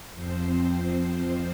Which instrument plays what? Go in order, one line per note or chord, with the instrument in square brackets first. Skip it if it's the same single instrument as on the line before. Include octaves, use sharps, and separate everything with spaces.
[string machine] F2 F3 C4 C5
C5